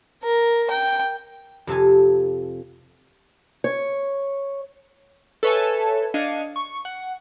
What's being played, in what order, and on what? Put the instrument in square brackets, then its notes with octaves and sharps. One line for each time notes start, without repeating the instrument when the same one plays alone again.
[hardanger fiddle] A#4
G5
[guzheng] F2 C3 A4 G#5
[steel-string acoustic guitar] C#5
[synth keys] A4 B4 C#5 E5 G#5 A5
D4 D#5 F5 G#6 C#7 D#7
C#6
F#5